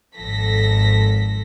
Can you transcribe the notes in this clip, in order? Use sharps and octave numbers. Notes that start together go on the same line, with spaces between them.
G#1 F3 A4 A#6 B6